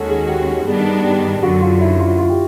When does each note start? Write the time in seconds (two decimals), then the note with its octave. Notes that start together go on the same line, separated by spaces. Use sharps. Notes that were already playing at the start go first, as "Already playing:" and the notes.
Already playing: D#2 D#3 G#3 C#4 F#4 A4
0.09 G#4
0.29 G4
0.47 G4
0.67 G2 D#3 G3 B3 D4 G#4
1.04 G4
1.42 F#2 D3 F#3 F#4
1.61 F4
1.80 E4
2.00 F4
2.18 F4
2.29 G4